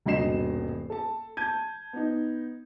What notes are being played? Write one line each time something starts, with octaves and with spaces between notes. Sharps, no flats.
D#1 G2 B2 D#5 C7 E7
A4 A5
A5 G6 G#6 D#7
B3 D#4